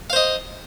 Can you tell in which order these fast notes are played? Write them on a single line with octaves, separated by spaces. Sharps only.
F5 C5 D#5